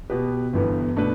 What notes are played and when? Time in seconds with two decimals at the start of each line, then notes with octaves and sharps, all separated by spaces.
0.10 B2 B3 G4 B4
0.53 G1 G2 E3 B3
0.96 B2 A3 D4 B4